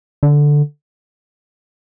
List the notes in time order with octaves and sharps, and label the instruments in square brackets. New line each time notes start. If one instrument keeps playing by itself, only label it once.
[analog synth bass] D3